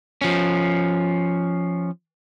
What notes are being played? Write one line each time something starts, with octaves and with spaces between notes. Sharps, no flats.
F3 C#4